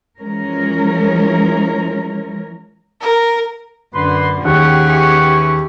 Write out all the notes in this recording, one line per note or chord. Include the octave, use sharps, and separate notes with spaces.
E3 F3 G#3 C#4 A#4
A#4
F#2 D3 B4 C6
D#2 C#4 G4 G#4 F#5 C#6
E3 C#6